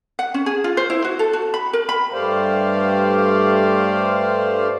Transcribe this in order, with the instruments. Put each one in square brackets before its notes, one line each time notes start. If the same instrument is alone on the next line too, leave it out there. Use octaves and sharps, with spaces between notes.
[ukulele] F#5
C#4
G#4
F4
C5
E4
F#4
A4
F#4
B5
A#4
B5
[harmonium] G2 A3 G4 C5 D5 F5